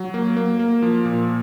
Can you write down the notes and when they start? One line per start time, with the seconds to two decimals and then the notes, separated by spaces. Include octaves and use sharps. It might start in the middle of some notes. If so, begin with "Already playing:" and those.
Already playing: F#3
0.14 A#3
0.37 A#3
0.59 A#3
0.82 F3
1.05 A#2